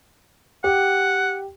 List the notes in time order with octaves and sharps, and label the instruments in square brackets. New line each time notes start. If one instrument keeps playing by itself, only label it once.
[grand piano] G4 [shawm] F#5